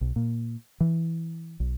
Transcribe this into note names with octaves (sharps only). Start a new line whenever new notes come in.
B1
A#2
E3
B1